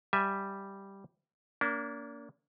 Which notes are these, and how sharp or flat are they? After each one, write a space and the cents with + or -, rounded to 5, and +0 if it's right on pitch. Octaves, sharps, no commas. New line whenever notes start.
G3 +0 E5 +0 G#5 +0
A#3 +0 D4 -40